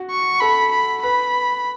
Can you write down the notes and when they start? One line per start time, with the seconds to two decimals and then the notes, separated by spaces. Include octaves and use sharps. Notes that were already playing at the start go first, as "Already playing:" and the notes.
Already playing: F#4
0.10 C#6
0.41 A4 B5
0.71 B5
1.03 B4 B5